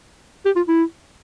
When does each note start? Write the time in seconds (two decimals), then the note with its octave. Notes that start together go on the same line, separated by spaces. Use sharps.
0.46 G4
0.56 F4
0.68 E4